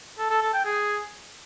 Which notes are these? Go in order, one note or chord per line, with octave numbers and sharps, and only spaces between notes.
A4
A4
A4
G5
G#4